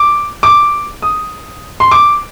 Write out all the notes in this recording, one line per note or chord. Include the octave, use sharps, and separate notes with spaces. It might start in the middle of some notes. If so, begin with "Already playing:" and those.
Already playing: D6
D6
D#6
C6
D6